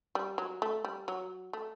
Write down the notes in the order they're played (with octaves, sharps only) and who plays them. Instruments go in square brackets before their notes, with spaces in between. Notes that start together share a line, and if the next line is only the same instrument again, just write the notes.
[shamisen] G3
F#3
A3
G3
F#3
A3